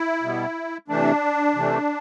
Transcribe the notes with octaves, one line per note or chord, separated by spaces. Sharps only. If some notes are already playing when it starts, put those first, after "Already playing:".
Already playing: E4
B2 G3 B3
C3 E3 A3 D4
C3 E3 A3